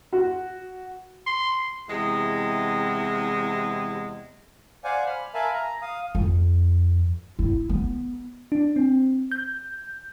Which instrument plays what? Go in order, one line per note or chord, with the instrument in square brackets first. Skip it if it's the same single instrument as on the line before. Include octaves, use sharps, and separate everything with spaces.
[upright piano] F#4
[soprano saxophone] C6
[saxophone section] E2 C3 G#3
[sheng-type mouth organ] C5 D5 F5 F#5 G#5
B5 F6
A#4 E5 F5 G#5 A5 B5
A#5
F5 D#6
[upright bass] F2
E4
B3
[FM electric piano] D4
C4
G6